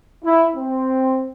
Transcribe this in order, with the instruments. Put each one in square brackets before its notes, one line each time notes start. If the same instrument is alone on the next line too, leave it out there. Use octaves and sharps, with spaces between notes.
[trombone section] E4
C4